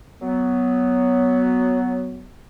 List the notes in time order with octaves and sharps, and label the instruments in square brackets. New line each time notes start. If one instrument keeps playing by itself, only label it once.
[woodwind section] F#3 B3